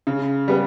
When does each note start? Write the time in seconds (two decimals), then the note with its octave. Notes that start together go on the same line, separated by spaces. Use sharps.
0.07 C#3
0.48 G3 B3